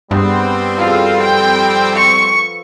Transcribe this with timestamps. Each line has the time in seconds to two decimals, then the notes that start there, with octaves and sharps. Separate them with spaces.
0.11 G2 G3 B3 C4
0.78 F3 F4 A4
1.23 G5
1.96 C#6